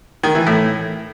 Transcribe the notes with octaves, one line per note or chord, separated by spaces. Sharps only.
D#3
E3
A2